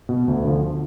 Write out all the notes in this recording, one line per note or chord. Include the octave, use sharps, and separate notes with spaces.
B2
D2
D3 F3